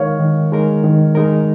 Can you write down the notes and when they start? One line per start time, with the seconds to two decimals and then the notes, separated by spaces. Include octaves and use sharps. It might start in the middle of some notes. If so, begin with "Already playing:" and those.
Already playing: D#3 G#3 D#4 A#4 C#5 F5
0.19 D#3
0.52 G#3 D#4 A#4
0.84 D#3
1.15 G#3 D#4 A#4